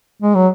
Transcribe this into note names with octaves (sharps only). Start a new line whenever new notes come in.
G#3
F#3